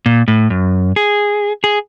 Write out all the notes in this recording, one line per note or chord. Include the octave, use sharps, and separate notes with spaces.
A#2
A2
F#2
G#4
G#4